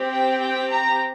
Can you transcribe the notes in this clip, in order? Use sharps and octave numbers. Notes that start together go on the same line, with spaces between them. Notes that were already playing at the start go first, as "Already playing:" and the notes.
Already playing: C4 G4
G5
G5
A#5